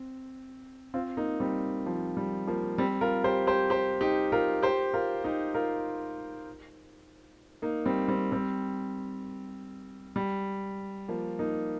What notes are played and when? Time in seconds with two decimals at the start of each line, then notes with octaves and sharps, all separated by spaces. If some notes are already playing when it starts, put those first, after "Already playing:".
Already playing: C4
0.94 C4 F4
1.17 A#3 D#4
1.40 G3 C4
1.86 F3
2.17 G3
2.47 F3 A#3
2.78 G3 C4
3.01 F4 A#4
3.24 G4 C5
3.47 G4 C5
3.70 G4 C5
4.01 D#4 G4
4.32 F4 A#4
4.63 G4 C5
4.94 F4 A#4
5.24 D#4 G4
5.54 F4 A#4
7.62 A#3 D#4
7.86 G3 C4
8.08 G3 C4
8.32 G3 C4
10.16 G3
11.08 F3 A#3
11.39 A#3 D#4